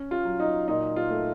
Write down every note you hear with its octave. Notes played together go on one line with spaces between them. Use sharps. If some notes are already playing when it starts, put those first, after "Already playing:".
Already playing: C#4
F4
F#3
D#4
A#2 D#4
F4
A3